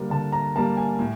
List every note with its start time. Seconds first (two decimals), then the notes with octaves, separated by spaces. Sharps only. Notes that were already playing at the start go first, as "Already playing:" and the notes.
Already playing: D3 G3 A#3
0.10 D3 A5
0.32 A#5
0.56 G3 A#3 A5
0.77 G#5
0.99 A2